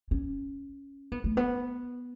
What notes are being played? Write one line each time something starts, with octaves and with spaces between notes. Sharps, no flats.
C#4
B3
A3
B3